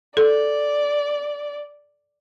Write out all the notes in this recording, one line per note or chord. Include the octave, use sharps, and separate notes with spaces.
A4 D5